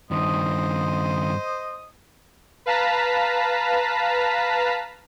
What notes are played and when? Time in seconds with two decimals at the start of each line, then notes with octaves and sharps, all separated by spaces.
0.11 G2 D#3 C5 D#5 D#6
2.66 B4 F5 A5 A#5 B6